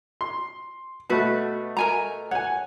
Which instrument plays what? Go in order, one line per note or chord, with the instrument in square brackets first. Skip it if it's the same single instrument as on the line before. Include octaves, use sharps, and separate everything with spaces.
[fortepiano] C6
[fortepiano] B2 A3 [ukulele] F#4 B4
[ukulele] A#4 G#5 A#5
[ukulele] C#5 [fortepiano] F#5 G#5